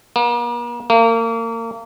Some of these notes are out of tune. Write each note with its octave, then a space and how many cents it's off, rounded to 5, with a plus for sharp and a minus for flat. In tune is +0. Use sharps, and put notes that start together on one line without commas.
A#3 +45
A#3 -30